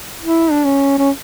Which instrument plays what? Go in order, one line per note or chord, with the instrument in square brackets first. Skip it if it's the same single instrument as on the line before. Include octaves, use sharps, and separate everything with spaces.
[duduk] E4
D4
C#4
C#4